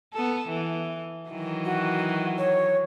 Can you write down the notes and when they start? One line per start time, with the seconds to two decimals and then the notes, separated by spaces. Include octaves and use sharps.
0.14 B3 A4
0.48 E3
1.29 D#3 E3 F#3
1.65 F#4
2.37 C#5